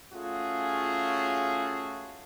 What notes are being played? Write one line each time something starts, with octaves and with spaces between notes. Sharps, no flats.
A3 C#4 F4 F#4 G#4